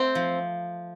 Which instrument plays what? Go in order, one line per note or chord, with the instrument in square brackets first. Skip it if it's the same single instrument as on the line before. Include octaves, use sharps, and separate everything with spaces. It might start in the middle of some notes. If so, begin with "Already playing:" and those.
Already playing: [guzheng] A3 [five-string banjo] C4
[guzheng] F3